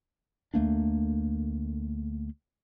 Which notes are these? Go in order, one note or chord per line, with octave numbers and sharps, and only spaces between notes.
D2 A3 A#3 D4